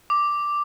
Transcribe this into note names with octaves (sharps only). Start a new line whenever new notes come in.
D6